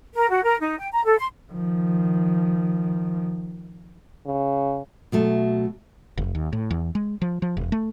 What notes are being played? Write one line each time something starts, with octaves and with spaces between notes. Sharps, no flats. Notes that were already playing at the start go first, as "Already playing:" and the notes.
A#4
F#4
A#4
D#4
G5
A#5
A4
C6
D#3 F3
C#3
B2 F#3 A3
F1
D#2
A2
E2
G#3
F3
F3
E1
A3